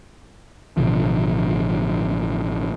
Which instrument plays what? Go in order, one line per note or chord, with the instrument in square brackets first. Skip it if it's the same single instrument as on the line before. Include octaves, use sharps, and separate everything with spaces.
[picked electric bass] A1 B2 D3 F3